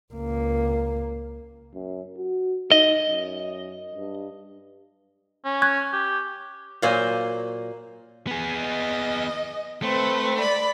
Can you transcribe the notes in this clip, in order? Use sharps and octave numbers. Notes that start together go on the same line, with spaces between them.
C#2 A#3
F#2
F#4
D#4 D#5
F#2
G2
C#4
C#6 F#6 G#6
G4
A#2 F#3 A#3 C5 G#5
B3 G#4
D#5
A3 C4 B4
D5 B5